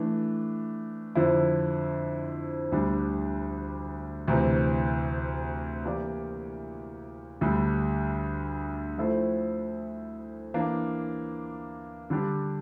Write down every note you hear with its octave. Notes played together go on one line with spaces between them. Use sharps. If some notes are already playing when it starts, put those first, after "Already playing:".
Already playing: E3 A3 D4
F2 D3 F3 C4 E4
D2 D3 G3 D4
D2 C3 E3
E3 A#3 E4 G4 D5
D2 D3 G3
F3 A3 E4 A4 C5
E3 A#3 D4
D3 G3 D4 G4